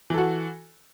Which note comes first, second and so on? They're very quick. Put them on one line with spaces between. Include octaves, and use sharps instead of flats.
E3 A4 F#4